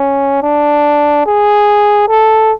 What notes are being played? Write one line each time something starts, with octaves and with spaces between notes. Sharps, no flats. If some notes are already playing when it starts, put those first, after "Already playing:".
Already playing: C#4
D4
G#4
A4